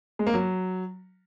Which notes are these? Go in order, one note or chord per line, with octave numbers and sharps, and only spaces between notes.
G#3
A#3
F#3